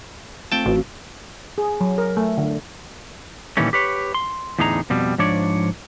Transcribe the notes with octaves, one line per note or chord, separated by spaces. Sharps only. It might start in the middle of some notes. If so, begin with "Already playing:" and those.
A3 C4 F4 G5 A5
A1 F#4
G#4
F#3
A#4
A3
D3
A#2 D#3 E3 G3 A3 C#4
G4 B4 C#5
C6
E2 A2 D3 D#4 G#4 A#5
F2 B2 G3
G#2 F3 D4 C#5 D5